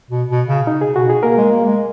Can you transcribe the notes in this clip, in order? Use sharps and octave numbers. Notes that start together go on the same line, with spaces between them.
B2
B2
C#3
D#4
G#4
B2 F#4
G#4
A#3 A#4
G#3
A#3
G#3